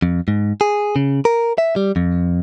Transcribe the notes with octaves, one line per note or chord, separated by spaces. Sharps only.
F2
G#2
G#4
C#3
A#4
E5
G3
F2